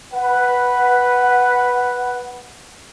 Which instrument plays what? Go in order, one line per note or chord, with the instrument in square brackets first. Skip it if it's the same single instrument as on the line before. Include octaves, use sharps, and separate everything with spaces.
[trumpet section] B4 F#5